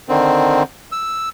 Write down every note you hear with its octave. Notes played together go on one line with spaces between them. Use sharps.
D3 D#3 C4
E6